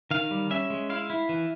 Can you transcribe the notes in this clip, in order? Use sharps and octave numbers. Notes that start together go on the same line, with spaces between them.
D#3 F5
G3
C#4 E5
G#3
E4 F5
E4
E3